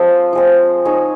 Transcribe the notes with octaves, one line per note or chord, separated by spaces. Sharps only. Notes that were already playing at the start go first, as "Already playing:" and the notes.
Already playing: F3 G#3 C4
F3 G#3 C4
D#4 G#4 C#5